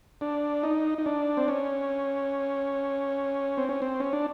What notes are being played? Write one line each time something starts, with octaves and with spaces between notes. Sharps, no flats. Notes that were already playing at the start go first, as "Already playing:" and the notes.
D4
D#4
D#4
D4
C4
C#4
C4
C#4
C4
C#4
D4